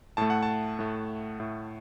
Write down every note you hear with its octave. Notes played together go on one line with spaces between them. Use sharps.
A2 A3 A5
F#5
A5
A2 A3
A2 A3